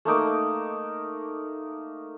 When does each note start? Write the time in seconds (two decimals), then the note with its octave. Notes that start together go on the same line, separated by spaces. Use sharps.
0.05 A3 A#3 D#4 D6